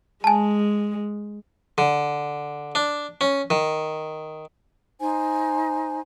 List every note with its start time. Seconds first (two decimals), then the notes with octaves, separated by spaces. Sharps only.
0.24 G#3 G#5 A5
1.78 D3
2.75 D4
3.21 C#4
3.50 D#3
5.00 D#4 C5 G#5